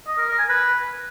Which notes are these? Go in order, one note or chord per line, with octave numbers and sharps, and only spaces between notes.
D#5
A#4
A#4
G#5
B4